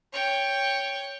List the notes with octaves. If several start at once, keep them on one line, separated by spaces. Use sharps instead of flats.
C#5 G5